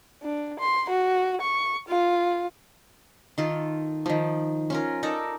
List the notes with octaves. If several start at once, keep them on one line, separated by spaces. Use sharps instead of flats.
D4
C6
F#4
C#6
F4
D#3 F4 A4
D#3 F3
C#4 F4 A#4
D#4 A4 A#4 D5